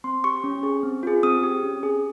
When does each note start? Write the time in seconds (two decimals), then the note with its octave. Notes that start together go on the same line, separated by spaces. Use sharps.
0.04 C4 C6
0.24 G4 C#6
0.44 C#4
0.63 G#4
0.83 C4
1.03 F4 G#4
1.23 C4 D#6
1.43 G4
1.63 C#4
1.83 G#4